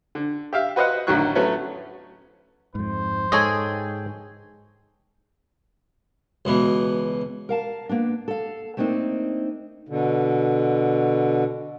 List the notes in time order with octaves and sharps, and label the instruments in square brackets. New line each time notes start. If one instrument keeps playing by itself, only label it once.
[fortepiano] D3
G4 E5 F5
F#4 B4 C5 D#5 F5 F#5
A1 D3 D#3 F#3 C#6 F#6
F#3 A3 B3 C#4
[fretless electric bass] F2 G#2 [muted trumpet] C5
[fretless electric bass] G#2 [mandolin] G#4 G5 G#5 [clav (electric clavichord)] A4 C#5 D#5
[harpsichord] C#2 B2 E3
[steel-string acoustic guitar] A#4 F5 A5
A#3 B3 D4
A4 F5
A3 A#3 C4 D4 D#4
[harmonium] B2 D3